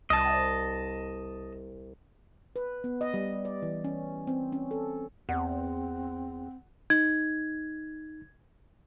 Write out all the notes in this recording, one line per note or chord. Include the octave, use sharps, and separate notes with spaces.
C2 D#5 A5
B4
B3
D#5
G3
D5
E3
C#4
C4
C#4
A4
E2 C4 F#5
D#4 G#6